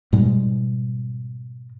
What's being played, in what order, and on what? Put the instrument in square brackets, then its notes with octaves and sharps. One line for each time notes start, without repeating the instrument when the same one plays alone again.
[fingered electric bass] G#2 B2 G3 G#3